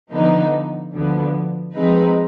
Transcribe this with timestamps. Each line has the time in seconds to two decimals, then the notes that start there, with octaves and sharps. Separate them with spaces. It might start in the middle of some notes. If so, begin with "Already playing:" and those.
0.11 D3 F3 B3 D#4
0.92 D2 D3 F3 B3
1.73 F3 G#3 C4 D#4 B4